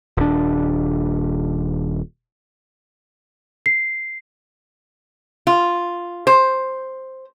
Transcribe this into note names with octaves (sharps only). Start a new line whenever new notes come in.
D#1 D4
C7
F4
C5